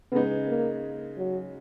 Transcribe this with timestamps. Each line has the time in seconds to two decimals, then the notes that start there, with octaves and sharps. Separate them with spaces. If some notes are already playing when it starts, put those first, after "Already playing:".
0.12 C#3 G#3 B3 D#4
0.47 A#3
1.17 F#3